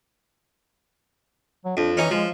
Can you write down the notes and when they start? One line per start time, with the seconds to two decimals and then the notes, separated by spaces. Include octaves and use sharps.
1.65 F#3
1.77 F2 D4
1.97 E3 C#4 D#4
2.11 F3 G#3